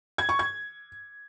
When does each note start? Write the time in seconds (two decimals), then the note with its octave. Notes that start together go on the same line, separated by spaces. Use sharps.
0.18 G#6
0.29 C#6
0.39 G#6